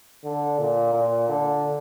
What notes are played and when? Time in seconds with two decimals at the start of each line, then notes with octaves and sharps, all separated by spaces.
0.24 D3
0.59 A#2
0.94 A#2
1.29 D3